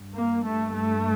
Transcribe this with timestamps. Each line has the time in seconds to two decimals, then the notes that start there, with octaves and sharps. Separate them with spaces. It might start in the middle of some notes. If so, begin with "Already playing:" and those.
Already playing: G2
0.15 A#3
0.44 A3
0.74 A3